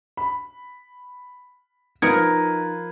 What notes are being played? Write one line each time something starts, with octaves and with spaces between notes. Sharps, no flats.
B5
F3 D#4 F4 A#4 B4 G#6